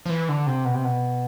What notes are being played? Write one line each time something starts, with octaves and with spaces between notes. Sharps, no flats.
F3
E3
D3
C3
B2
C3
B2